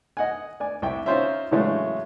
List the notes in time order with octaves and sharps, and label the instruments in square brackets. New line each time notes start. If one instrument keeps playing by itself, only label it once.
[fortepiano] D#5 F#5 G#5
D5 G#5
C2 E5 G5
C#4 D#4 F4 C5 C#5 E5
A2 C#3 E3 F#3 G#3 A3